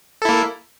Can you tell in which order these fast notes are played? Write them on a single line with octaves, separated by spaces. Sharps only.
A4 E4 A#3